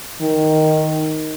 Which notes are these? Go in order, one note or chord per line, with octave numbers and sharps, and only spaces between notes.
D#3